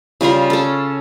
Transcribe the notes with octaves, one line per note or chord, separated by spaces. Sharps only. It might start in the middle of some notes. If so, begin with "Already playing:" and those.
C#3 G3 F4 A#4
C#4 A4